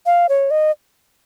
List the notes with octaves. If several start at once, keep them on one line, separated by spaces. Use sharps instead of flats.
F5
C#5
D#5